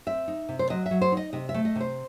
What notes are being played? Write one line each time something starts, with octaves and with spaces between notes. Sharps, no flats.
C4 E5
D#4
C3
C5
F#3 D#5
E5
F#3
C5
D#4 D#5
C3 D#5
E5
A3
D#5
C3 C5